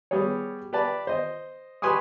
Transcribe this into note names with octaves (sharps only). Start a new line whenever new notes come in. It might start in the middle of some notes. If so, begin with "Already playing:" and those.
G3 B3 G#4 C#5
G4 B4 D5 A5
C5 D#5
G4 B4 G#5 C6 C#6 D#6